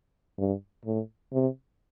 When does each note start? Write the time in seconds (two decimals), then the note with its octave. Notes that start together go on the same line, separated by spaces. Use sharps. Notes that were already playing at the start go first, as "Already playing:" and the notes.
0.39 G2
0.86 A2
1.33 C3